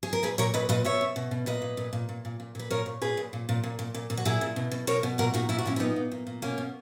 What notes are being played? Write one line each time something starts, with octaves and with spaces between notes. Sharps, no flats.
G#4
A#4
A#2 G#4 B4
A#2 A#4 C#5
A#2 B4 D#5
A#2 B4 D#5
B2 C#5 E5
B2
B2
B2
A#2 B4 D#5
A#2
A#2
A#2
A#2
A#2
A#2
A#2 B4
A#2 A#4 C#5
A#2
A#2 G#4 B4
A#2
A#2
A#2
A#2
A#2
A#2
A#2
F#4
A#2 E4 G#4
A#2
B2
B2
B2 A#4 C#5
B2
A#2 F#4 A#4
A#2 D#4 F#4
A#2 E4
F#4
A#2 C#4 E4
E4
A#2 B3 D#4
A#2
A#2
A#2
B2 A#3 C#4
B2